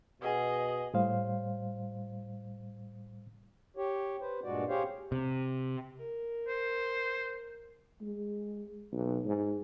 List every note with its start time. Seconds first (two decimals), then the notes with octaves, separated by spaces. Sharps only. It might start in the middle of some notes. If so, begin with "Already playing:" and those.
0.22 B2 G#4 B4 D#5 F#5
0.94 A2 G3 C5 F5
3.77 G4 C#5
4.21 B4 C5
4.44 G2 A#2 G#3 F#4 D5
4.69 G4 G#4 C5 C#5 F5
5.12 C3
5.98 A#4
6.48 C5
8.01 G#3
8.92 B1
9.25 G#2